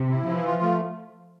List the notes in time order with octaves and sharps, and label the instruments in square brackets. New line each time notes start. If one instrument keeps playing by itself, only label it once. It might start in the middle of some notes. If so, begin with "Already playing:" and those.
Already playing: [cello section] C3
[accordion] E4
[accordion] E3 [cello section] F3
[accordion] F4
A3